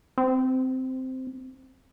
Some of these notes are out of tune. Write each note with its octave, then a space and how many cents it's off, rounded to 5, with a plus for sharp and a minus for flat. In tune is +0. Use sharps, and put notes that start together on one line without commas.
C4 -10